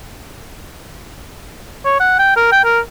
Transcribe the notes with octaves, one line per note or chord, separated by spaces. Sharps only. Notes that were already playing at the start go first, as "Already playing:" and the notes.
C#5
F#5
G5
A#4
G5
A#4